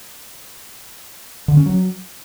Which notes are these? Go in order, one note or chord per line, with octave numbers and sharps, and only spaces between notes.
D3
C#4
F#3